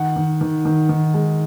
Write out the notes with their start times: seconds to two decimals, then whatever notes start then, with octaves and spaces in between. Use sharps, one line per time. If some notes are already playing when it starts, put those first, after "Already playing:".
Already playing: D#3 F#5
0.16 D#3
0.41 D#3
0.65 D#3
0.89 D#3
1.14 G#3